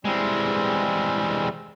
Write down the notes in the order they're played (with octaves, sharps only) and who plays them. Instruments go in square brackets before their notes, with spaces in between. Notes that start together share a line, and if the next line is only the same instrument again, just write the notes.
[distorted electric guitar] E3 G#3 [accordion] G3 C4